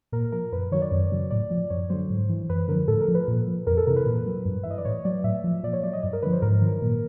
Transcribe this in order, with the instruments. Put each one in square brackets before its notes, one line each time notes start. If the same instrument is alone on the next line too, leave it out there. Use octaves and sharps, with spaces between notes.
[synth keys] A#2 A#4
F3 A#4
F#2 B4
D#3 F#3 C#5
D5
F#2
C#3 F#3
A2 D5
F3
F#2 C#5
D3 F#3 C5
G#2
E3
F#2 B4
D3 F3 A#4
A2 A4
A#4
F3
B4
A#2
F3
F2 A#4
A4
C3 E3 A#4
B4
A#2
F#3
G2
E3 E5
D#5
D5
A2 C#5
F#3 D5
A2 E5
F3
A#2 D5
C#5
F#3 D5
D#5
G2 D5
A#4
D3 F3 B4
C5
G#2 A#4
D#3 F#3
A#2